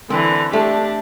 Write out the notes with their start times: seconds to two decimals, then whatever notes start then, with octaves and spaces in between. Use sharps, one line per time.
0.10 D3 E3 C4
0.53 A3 D4 G4